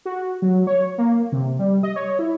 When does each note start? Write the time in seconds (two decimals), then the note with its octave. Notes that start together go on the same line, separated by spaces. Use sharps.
0.05 F#4
0.42 F#3
0.67 C#5
0.98 A#3
1.32 C3
1.59 G3
1.83 D#5
1.96 C#5
2.19 E4